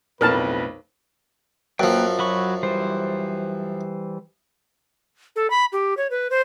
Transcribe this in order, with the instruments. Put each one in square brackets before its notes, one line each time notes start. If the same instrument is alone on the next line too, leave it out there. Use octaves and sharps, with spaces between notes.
[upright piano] B1 F2 F6 [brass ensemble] A2 B4 [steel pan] A#4 A5
[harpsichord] F#2 F3 [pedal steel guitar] A#3 B4 G5
[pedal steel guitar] F#3 B5 C#6
E3 G3 C5
[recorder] A4
B5
G4
C#5
B4
C5